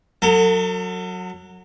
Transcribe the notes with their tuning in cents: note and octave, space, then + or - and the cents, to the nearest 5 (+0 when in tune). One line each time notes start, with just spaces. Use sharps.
F#3 -15 A4 +40